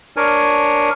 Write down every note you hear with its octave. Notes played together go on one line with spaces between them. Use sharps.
D4 A#4 C#5 G#5